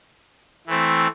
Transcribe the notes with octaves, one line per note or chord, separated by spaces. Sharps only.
E3 A3 C4